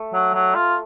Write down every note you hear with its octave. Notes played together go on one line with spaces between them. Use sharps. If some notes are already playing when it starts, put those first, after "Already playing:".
Already playing: A3
F#3
F#3
F4